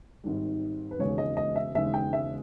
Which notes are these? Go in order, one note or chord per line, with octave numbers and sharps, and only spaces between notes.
G#1 G#2 D#3 G3
B4
E1 D#2 C#3 G#3 C#5
D#5
D#5
E5
E1 D#2 C#3 G#3 E5
G5
E5